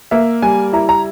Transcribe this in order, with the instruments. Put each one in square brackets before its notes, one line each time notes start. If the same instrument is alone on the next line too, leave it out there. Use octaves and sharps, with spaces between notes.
[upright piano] A#3 E5
G3 G#5
E4 A#5
A#5